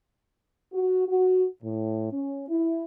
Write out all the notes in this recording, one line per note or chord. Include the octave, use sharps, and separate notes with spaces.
F#4
F#4
A2
C#4
E4